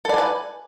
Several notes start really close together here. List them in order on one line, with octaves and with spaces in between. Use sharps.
A4 D5 G#5 B4